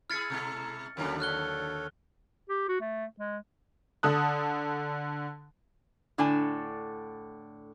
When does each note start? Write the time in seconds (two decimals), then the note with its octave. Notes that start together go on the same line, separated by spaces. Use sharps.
0.10 E4 G#4 F6 A6 C#7
0.30 B2 G#3 E4 A4
0.97 D#2 D3 D#3 F#3 C#4 D4 A#4
1.20 A4 C#5 F6 F#6 G7
2.49 G4
2.69 F#4
2.81 A3
3.19 G#3
4.03 D3 A5 D#6 F#6
6.18 A2 D3 D4 D5 G#5 A5